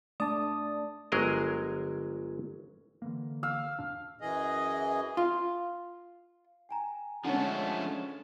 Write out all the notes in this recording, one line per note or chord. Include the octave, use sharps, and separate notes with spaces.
A3 D4 D5 A5 D#6
G1 F#3 G#3 G#4 A#4 D#5
D3 E3 A#3
F5 E6
E2 A#2 D4
F#2 E3 G#4 D#5
F4
G5 G#5 A#5
D3 F3 G#3 A3 C#4 F#5 A5